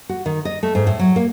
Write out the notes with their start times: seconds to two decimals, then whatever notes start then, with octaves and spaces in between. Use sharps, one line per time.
0.09 F#4
0.26 D#3
0.45 D#5
0.63 A3
0.75 G#2
0.87 A2
1.00 F#3
1.16 A#3